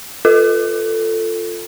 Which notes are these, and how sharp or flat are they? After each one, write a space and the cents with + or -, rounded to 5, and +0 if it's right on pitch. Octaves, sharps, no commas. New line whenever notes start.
F4 +0 A4 +15